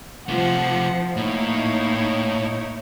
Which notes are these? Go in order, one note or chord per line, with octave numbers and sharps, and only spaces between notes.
C3 F3 A3 F#5
A2 A#3 D#4 E4 C#5